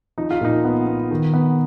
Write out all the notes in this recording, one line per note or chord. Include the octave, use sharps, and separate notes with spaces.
F3 D#4
F4
A#2 D#4
B3
B3
D#3
B3